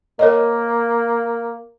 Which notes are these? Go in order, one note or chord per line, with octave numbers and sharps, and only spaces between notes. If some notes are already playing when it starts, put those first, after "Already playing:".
A#3 A#4 C#5 D#5